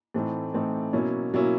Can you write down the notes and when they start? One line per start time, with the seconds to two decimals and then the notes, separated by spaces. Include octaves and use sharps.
0.14 A2 E3 A3 C4 D#4
0.54 A2 E3 A3 C4 D#4
0.93 B2 F#3 A#3 C#4 E4
1.33 B2 F#3 A#3 C#4 E4